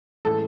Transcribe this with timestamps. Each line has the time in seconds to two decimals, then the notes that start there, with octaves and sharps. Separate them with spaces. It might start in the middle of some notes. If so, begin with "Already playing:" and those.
0.25 A2 E3 G#3 C#4 A4